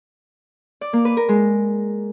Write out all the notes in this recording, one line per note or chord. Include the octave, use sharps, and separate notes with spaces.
D5
A#3
B4
A#4
G#3